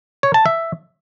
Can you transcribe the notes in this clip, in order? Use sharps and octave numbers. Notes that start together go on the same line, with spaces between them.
C#5
A5
E5